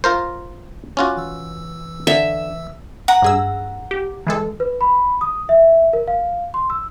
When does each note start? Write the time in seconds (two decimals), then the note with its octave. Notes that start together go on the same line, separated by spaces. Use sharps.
0.04 F4 A#4 C5
0.97 C#4 F4 F#4 D6
1.17 E3 E6
2.07 D3 E5
3.08 F#5 A#5
3.22 G2 G#4 E6
3.91 G4
4.27 E3 G#3 A4
4.60 B4
4.81 B5
5.21 D#6
5.49 E5
5.93 A#4
6.08 F5
6.54 C6
6.70 E6